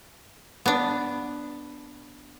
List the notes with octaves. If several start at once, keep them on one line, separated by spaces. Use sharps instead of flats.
B3 D4